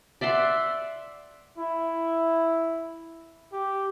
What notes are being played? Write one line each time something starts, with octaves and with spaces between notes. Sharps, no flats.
D5 E5 F#5 C6
E4
G4